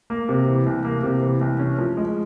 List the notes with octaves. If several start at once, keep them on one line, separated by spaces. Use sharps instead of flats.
A#3
C3
E3
C2
A#3
C3
E3
C2
C#4
F3
G#3